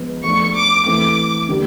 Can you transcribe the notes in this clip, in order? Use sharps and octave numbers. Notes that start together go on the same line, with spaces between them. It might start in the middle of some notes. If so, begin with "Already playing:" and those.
Already playing: F3 G#3 B3
F3 A3 D4 C#6
D6
E3 A3 C4 D6
D3 G3 A#3